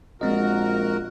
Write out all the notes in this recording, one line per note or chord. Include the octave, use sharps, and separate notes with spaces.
A#1 G#3 C4 F#4 A#4 D#5